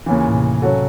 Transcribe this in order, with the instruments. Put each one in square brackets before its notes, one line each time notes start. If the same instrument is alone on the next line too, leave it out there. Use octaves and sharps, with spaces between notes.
[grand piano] D#2 C#3 E3
[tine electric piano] A2
C3
[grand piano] C#3 F#3 C#4 F#4 A4